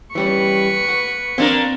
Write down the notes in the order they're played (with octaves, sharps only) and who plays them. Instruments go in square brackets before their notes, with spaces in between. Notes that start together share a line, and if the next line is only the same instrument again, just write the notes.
[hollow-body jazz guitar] E3 G3 C#4 [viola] B4 C#6
[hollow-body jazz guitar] F#5
[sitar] A#3 D4 A#4 [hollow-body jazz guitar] C4 F5